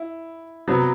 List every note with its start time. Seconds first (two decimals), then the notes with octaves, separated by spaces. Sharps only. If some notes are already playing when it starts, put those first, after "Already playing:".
Already playing: E4
0.68 C3 F#3 B3